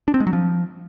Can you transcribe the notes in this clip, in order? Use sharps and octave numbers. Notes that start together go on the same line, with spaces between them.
D4
C4
G#3
F#3
F3